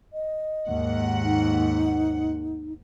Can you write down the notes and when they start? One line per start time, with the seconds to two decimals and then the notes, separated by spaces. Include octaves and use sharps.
0.13 D#5
0.68 D#2 G#2 F#5
1.24 D#4